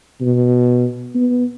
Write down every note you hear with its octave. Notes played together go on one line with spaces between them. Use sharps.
B2
B3